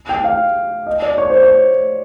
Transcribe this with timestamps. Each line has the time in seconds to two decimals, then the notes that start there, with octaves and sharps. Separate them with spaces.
0.09 G5
0.24 F5
0.87 D#5
1.02 D5
1.18 C#5
1.30 C5
1.43 C#5